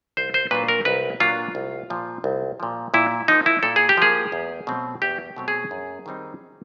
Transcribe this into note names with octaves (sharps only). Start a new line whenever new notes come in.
C2 C5
C5
A#2 F#3 A#3 D4 B4
A#4
C2 B4
A#2 F#3 A#3 D4 F4
C2
A#2 F3
C2
A#2 F3
A#2 E4
F3 A#3 D#4
E4
A#2 A4
G#4
G4
F3 A#3 G#4
E2
B2 F#3 A3 C4
E2 G4
B2 F#3 A3 C4
G#4
F#2
D#3 G3 C4 D#4